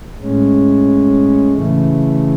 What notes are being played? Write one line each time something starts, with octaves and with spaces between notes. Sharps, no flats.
A2 G#3 C#4
C#3 E3 A3